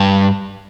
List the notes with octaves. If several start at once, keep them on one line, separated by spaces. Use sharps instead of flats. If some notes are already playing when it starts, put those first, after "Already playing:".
Already playing: G2